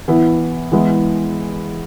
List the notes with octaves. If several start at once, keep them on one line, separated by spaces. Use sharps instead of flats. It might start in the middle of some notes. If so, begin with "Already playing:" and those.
E3 B3 E4
E3 G#3 B3 E4